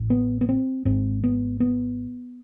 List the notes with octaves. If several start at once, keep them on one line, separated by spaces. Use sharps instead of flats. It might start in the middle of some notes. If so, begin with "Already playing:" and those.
Already playing: A1
B3
B3
C4
G#1 G#2 C4
B3
B3